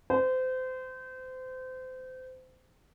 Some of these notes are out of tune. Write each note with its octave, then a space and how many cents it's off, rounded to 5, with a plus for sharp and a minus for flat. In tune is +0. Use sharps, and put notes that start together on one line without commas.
C5 -30